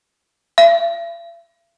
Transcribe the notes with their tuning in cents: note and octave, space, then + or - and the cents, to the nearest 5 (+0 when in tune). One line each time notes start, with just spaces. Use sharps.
E5 +45